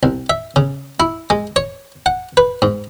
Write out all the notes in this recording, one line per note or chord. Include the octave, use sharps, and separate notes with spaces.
C2
E5
C#3
E4
G#3
C#5
F#5
B4
G#2